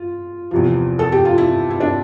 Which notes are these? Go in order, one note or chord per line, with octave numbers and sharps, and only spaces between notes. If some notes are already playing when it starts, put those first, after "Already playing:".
Already playing: F4
E2 C3 F3
A4
G4
F4
E4
E4
D4